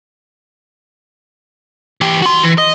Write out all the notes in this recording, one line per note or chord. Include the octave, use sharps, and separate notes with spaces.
E3 G4
F#4 C6
E3
D#5